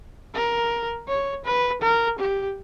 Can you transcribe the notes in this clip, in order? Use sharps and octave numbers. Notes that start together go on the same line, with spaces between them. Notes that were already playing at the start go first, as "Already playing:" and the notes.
A#4
C#5
B4
A#4
G4